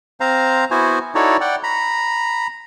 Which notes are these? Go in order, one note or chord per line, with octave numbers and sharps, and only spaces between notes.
C4 C5 F5 A#5
B3 E4 F#4 C5 G#5
D#4 E4 F#4 A4 C#5 D5
D5 F#5 G5
A#5 B5